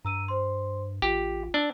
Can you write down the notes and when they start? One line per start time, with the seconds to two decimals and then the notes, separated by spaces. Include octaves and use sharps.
0.05 G2 A#5 E6 D#7
0.28 C5 C6
1.02 A1 F4 G4
1.54 D4 E6